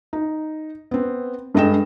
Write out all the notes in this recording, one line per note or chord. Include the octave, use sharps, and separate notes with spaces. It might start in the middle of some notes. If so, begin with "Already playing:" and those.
D#4
B3 C4
G2 G#3 A4 D#5 G5 E7